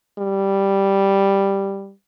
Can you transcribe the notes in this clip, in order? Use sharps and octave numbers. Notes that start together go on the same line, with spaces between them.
G3